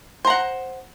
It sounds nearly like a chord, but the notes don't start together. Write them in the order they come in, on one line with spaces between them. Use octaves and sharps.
C5 A#5 F#5